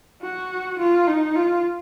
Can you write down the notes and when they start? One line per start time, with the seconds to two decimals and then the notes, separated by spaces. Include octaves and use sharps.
0.22 F#4
0.79 F4
1.07 D#4
1.35 F4